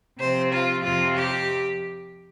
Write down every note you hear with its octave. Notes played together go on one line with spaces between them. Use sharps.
C3 F3 C4 C5
F4
F2 C3 F3 C4 F4
G4